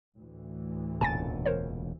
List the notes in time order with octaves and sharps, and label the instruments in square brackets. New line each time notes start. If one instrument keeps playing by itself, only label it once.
[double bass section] D2 A2 E3
[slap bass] E1 A#2 C#3 [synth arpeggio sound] G#5 A5 A6
[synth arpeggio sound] A#4 C5 C#5